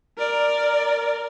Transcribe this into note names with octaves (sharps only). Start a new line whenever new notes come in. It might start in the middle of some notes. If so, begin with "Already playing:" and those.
A#4 D5